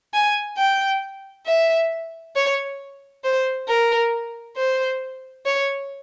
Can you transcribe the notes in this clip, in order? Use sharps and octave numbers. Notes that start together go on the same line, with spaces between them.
G#5
G5
E5
C#5
C5
A#4
C5
C#5